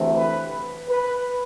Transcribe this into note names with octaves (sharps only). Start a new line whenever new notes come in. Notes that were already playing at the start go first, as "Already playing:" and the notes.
Already playing: D2 C3 E3 A3 C4
B4
B4